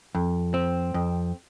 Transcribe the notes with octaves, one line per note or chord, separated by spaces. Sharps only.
F2
C4
F2